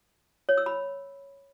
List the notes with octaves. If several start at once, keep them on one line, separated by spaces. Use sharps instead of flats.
C#5
E6
B5